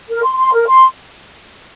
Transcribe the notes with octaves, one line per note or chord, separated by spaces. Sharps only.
A#4
C6
C6
A#4
C6